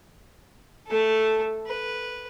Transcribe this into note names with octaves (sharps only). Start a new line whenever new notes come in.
A3 A4
B4